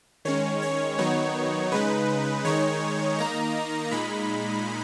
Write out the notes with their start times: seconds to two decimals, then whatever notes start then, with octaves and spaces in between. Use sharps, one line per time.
0.25 D#3 G#3 C#4 C#5
0.62 C#5
0.98 D#3 F#3 B3 D#4 C#5
1.72 C#3 G#3 D#4 B4
2.45 D#3 G#3 D#4 C#5
3.18 D#3 A#3 D#4 A#5
3.92 A#2 G#3 D#4 B5